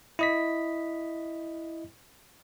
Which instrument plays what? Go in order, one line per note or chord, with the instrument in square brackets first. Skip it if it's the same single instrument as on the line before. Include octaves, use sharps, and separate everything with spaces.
[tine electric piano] E4 D#5 B6